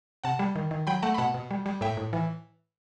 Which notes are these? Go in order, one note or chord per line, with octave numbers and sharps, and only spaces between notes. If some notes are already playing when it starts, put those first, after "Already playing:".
C3 F#5 A5
G3
D#3
D#3
F#3 G5 B5
A3 F#5 A5
B5
B2 F#5 A5
B2
G3
G3
A2 E5 G5
A2
E3